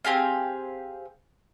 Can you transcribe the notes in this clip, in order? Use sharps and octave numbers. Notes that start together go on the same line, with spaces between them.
C4 G4 G#4 F5